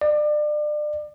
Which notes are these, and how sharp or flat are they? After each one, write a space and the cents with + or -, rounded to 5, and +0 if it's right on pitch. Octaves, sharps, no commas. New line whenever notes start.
D5 +30